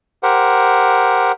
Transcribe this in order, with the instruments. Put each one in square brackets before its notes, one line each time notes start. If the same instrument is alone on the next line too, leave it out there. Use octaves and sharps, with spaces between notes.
[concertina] G4 A#4 C5 F#5